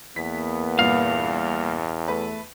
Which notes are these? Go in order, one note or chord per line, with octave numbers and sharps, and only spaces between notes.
E2 A#3 B3 B6
G2 A#2 F5
A3 B4